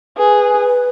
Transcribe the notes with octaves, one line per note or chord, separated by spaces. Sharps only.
G#4 B4